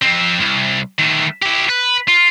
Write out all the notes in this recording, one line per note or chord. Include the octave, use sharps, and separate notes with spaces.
F2 C4
C2
D#3 A3
E4 G4
B4
F4